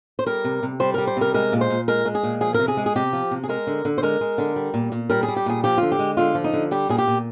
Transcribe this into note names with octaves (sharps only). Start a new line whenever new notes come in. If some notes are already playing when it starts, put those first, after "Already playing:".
C5
G3 A#4
C3
C3
G3 C5
G3 A#4
C5
C3 A#4
G#3 A#4
A#2
C5
A#2
G#3 A#4
G#3
G#4
A#2
F3 G#4
C3 A#4
G#4
G#3
G#4
C3 G4
F3
C3
G#4
G#3 A#4
D3
D3
C5
G#3 A#4
G#3
D3
G3
A#2
A#2
G3 A#4
G#4
G3
G4
A#2 G#4
F3 G4
D3 F4
G4
G#3
D3 F4
F3
D#4
D3
G3 G4
A#2 G#4
G4
A#2